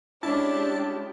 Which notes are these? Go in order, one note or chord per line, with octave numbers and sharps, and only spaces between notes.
G#3 C#4 D4 E4 G4 A5